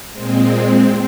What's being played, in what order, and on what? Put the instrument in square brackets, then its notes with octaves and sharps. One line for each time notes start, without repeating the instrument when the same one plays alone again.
[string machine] A#2 G#3 C4